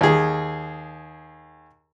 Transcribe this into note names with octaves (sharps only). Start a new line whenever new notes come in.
D#2 G#4